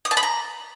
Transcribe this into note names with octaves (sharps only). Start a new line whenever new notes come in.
D#6
A5
B5
A#5